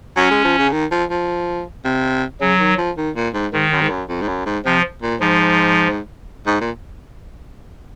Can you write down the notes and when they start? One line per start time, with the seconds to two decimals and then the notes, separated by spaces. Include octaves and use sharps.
0.17 F#3 C#4
0.31 G#3
0.45 F3
0.59 C#3
0.72 D#3
0.91 F3
1.10 F3
1.85 C3
2.41 C#3 F#3
2.59 D#3
2.78 F3
2.97 D#3
3.16 A#2
3.34 G#2
3.53 G#2 D#3
3.71 F#2
3.82 G#2
3.90 F#2
4.09 F2
4.21 G#2
4.28 F#2
4.46 G#2
4.65 C3 F3
5.02 A#2
5.20 G#2 F3
6.47 G#2
6.61 A#2